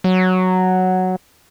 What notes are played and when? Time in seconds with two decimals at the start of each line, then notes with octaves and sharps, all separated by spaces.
0.04 F#3